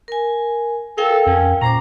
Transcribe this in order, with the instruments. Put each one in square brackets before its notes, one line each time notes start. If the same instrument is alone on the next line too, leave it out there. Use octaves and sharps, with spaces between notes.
[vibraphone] A#4 G#5
[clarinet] A4 [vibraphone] A#4 F5 G5
[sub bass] F2 [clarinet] C#4
[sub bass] A#2 [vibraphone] C#4 C5 D6 [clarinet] A#5